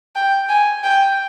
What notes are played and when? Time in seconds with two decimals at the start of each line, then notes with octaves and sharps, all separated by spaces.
0.15 G5
0.49 G#5
0.84 G5